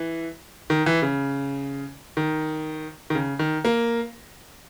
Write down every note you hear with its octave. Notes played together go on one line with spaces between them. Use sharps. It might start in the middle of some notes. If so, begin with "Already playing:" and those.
Already playing: E3
D#3
E3
C#3
D#3
D#3
C#3
D#3
A#3